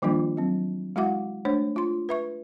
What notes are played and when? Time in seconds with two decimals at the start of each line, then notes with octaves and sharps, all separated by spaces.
0.02 D#3 F3 G3 A#3 D4 F4
0.37 F#3 C4
0.96 G#3 E4 F#4 E5 F#5 D6
1.45 A3 D4 C5 C#5
1.76 F4 C6
2.09 B4 E5 C#6